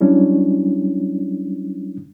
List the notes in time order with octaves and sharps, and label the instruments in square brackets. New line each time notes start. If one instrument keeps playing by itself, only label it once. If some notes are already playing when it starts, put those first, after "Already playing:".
[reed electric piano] F#3 G3 C#4 D4 E4